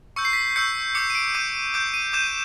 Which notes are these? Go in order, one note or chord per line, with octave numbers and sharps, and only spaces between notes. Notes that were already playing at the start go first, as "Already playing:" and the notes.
C#6 E6 G6 C#7
C7
B6
C7
C#6 E6 G6 C#7
D6 G6 C#7
D#7
D7
D6 G6 D#7
D6 G6 D7
D#7
D6 G6 E7
D#7